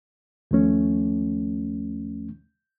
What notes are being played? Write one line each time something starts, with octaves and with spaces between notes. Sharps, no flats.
D#2 F3 A3 C#4